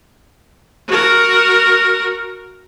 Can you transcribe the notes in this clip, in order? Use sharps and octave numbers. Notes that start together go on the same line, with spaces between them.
F#4 A#4